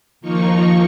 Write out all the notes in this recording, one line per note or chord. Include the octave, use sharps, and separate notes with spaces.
D#2 F3 A#3 D#4 F4 C#6